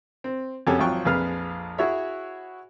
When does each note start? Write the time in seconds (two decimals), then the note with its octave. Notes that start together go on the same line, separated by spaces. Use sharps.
0.24 C4
0.67 F2 C#4 F#4 G4 A4 G#5
0.78 G#1 F3 F#3 F4 G5 C#6
1.05 A#1 F2 G#4 B4 F5 F6
1.78 E4 F#4 G#4 C#5 E5